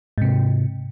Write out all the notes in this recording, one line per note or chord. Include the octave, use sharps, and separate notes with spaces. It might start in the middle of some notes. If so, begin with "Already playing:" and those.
G#2 C3